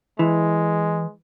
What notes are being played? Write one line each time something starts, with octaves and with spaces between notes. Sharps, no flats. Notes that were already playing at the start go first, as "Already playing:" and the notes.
E3 G#3